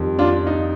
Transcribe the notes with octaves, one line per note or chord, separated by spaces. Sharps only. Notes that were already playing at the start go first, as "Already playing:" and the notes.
Already playing: F2 D#3 G3
D4 F4
D#4